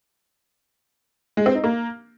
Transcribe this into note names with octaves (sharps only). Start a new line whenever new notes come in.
G#3
C4
D#4
A#3